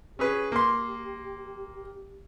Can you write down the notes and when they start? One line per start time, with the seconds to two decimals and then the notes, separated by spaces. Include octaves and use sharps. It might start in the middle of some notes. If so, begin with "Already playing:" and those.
0.19 C#4 G4 G#4 B4
0.52 A#3 C6